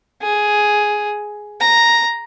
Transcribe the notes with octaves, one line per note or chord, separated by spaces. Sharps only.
G#4
A#5